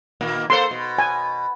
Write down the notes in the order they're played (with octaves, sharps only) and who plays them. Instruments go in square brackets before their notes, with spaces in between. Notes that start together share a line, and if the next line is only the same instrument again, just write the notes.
[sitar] A#2 D#3 A#3
[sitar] A#3 A4 C5 [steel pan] C6
[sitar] B2
[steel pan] G#5